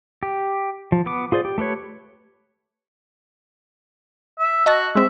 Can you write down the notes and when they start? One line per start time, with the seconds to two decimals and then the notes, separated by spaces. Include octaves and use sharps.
0.23 G4
0.92 F3
1.06 B3 D6
1.32 F4 G#4 C5 D5
1.45 G4
1.58 A3 G4 B4 C#5
4.39 E5
4.66 F#4 D#5 A5 A#6
4.95 G#3 C4 E5